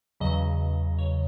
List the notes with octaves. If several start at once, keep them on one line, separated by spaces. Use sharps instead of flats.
E2 C#3 F#3 D#5
C#5